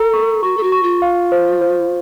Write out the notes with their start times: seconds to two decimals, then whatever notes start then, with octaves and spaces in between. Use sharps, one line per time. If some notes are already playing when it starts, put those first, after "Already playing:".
Already playing: A4 A#4 A#5
0.13 C#6
0.43 F#4 C#6
0.57 A4
0.63 F#4
0.72 C#6
0.83 F4
1.02 F5
1.32 C5
1.61 C5